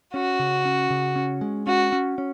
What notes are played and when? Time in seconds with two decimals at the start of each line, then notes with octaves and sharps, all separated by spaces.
0.14 C#4 F#4
0.39 C#3
0.65 C#4
0.90 C#3
1.16 C#4
1.41 G#3
1.67 C#4 F#4
1.92 C#4
2.18 C#4